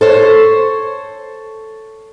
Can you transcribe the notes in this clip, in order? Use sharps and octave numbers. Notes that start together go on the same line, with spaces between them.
A4 C5 C#5